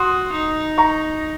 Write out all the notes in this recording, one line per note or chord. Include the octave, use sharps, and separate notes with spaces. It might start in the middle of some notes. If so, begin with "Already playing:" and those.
Already playing: F#4 C6 D#6
D#4
A#5 C#6